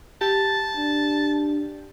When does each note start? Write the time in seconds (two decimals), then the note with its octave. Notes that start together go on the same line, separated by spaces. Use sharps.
0.21 G4 A5
0.77 D4